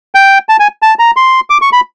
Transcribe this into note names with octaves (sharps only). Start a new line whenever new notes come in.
G5
A5
G#5
A5
A#5
C6
D6
C#6
B5